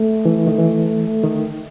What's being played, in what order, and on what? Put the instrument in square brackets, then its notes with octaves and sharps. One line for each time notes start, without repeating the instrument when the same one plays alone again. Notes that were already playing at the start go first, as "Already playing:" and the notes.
Already playing: [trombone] A3
[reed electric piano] E3
D#3
E3
D#3